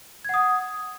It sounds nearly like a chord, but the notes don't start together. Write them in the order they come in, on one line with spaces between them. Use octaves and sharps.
G#6 F#5 D#6